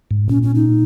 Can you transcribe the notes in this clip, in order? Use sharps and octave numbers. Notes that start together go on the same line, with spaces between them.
G#2
A#2 C#4
C#4
D#4